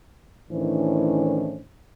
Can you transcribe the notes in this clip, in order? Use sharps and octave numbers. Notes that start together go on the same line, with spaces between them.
A2 D#3 E3 C#4 D4 C5